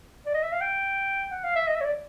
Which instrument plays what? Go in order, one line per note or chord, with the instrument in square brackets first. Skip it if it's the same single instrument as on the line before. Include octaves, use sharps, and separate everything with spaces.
[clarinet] D5
D#5
E5
F5
G5
F#5
F5
E5
D#5
E5
C#5
D5